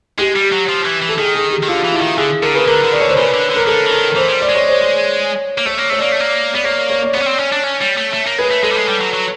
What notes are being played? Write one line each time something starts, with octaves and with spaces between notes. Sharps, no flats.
G#3 G4
G3
F#3
F3
E3
E3
A4
D#3 G#4
G#4
G4
D#3
D3 F4
E3
D3 E4
D#3
D3 G#4
D3 A#4
C#3 B4
D3 A#4
D3
D#3 D5
D3 C#5
C5
C#3 B4
D3
D3
A#4
D3 A4
E3
D#3 A#4
E3 C5
G#3
G3
D5
G#3
C#5
C5
C#5
A#3
A3 C#5
A#3
A3 C#5
A#3 D5
A3
A#3
B3 D5
A#3 C#5
C#5
D5
B3 C#5
C#4
C4
C#4
D4
C#4
G3
A3
A3
A#3
G#3 B4
A3
G#3 A4
G3
G#3
G3
F#3
F#3